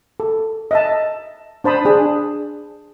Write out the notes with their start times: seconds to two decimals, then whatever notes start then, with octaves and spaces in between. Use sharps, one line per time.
0.20 A4
0.71 D#5 E5 A5
1.64 D4 C5 A5 B5 D#6
1.85 D4 G#4